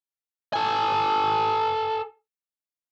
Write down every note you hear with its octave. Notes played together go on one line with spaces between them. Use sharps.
A4 G#5